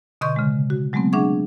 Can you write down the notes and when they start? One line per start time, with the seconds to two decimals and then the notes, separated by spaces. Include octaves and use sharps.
0.21 B2 D3 D#5 C6 C#6 G6
0.36 C#3 G#3
0.70 F#4
0.93 F#3 G#3 A3 B3 C4
1.12 D4 G#4 E5 F#5 C#6 G#6